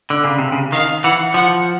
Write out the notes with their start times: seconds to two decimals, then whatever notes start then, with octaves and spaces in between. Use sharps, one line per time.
0.10 D3
0.24 C#3
0.39 C3
0.52 C#3
0.72 D#3 F5
1.04 E3 F#5
1.34 F3 F#5